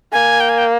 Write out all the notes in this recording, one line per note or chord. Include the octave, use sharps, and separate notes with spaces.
A#3 G#5
G5
G#5
G5